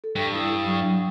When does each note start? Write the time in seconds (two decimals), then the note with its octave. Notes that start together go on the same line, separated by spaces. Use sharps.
0.04 A4
0.16 G2 C#6
0.34 E4 D#6 E6
0.64 F#3 C#6